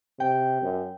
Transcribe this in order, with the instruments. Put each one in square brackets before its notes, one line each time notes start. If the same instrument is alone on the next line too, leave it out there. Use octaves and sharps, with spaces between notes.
[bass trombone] C3 [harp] G5
[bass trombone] F#2